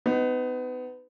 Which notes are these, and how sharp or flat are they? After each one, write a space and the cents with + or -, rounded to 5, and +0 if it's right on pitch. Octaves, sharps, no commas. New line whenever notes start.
B3 +30 D#4 +0